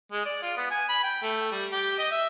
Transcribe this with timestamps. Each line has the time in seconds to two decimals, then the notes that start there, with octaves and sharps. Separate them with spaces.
0.12 G#3
0.26 D5
0.43 F4
0.57 B3
0.71 G#5
0.89 B5
1.04 G5
1.23 A3
1.52 G3
1.72 G4
1.99 D#5
2.11 E5